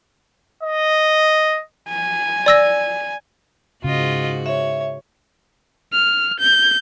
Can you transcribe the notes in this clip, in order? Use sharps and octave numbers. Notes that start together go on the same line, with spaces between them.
D#5
G#5
D5 E6 A#6
G#2 C#3 F4 F#4 D#5
C#5 E5
F6
G6